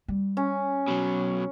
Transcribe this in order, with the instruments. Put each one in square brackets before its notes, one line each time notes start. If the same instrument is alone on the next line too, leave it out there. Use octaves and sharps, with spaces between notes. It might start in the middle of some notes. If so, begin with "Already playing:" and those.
[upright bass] G3
[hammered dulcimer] C#4
[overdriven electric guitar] B2 F#3